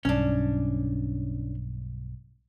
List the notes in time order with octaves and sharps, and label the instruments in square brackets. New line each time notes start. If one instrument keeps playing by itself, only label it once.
[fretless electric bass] B1 G2 [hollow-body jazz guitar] C#4 D4